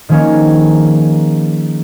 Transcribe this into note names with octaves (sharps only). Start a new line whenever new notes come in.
D#3 F3 A#3 C#4 G#4 A#4